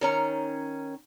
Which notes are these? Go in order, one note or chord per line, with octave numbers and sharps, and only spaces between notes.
D#3 C#4 A#5